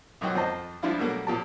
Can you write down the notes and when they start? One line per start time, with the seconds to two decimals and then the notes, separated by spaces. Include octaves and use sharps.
0.21 B1 F#2 F#3 D#4 F#4 G5
0.35 F2 C5 D#5 A5
0.82 F3 G3 D4 E4 F4
0.98 B2 F#3 G3 A3 A#3
1.27 A#2 F3 G4 A5